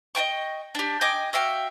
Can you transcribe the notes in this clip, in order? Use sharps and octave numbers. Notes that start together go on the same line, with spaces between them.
D#5 E5 G5 C#6
D4 G4
D#5 G5 G#5 D6
F#4 E5 F5 G5